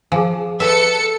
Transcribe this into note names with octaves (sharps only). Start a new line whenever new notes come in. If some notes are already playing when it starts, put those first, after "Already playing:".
F3 G#4 G#5
A4 B4 E5 C#7